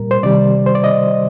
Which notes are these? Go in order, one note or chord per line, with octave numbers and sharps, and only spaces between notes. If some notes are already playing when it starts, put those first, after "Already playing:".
Already playing: A#2 G3 A#4
C5
C3 D#3 G3 D5
C5
D5
D#5